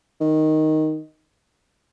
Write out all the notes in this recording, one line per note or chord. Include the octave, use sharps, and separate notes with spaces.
D#3